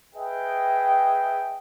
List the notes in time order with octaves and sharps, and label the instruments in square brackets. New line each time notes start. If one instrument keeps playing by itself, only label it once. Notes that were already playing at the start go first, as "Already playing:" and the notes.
[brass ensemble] G#4 B4 D#5 E5 G5